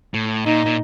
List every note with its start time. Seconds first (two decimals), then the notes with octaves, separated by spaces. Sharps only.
0.14 A2
0.45 A#2 D#4
0.66 A#2